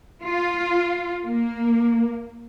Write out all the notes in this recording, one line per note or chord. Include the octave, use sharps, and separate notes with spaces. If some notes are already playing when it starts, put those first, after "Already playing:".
F4
A#3